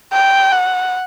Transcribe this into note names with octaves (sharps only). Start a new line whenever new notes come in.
G5
F#5